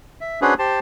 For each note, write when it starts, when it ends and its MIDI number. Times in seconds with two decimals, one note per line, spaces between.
0.21 0.40 76
0.42 0.54 61
0.42 0.54 62
0.42 0.54 66
0.42 0.54 68
0.42 0.54 71
0.42 0.54 72
0.59 0.80 67
0.59 0.80 72
0.59 0.80 81